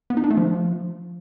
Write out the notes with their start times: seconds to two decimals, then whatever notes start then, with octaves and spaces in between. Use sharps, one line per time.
0.10 B3
0.17 D#4
0.24 D4
0.31 A3
0.37 F3